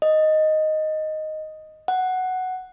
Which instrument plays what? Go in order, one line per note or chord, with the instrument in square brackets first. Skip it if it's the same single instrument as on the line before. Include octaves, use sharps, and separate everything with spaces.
[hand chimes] D#5
F#5